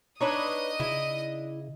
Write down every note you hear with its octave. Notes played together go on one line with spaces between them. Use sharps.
D4 D#4 B4 C#5 D#5 D#6
C#3 E4